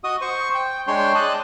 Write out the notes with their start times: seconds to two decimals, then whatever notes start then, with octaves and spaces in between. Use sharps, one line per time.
0.04 F#4 D#5 D#6
0.21 C5 C#6
0.55 G5
0.87 G#3 D4 C#5 G5 C6
1.15 D5 D#5 A5 F#6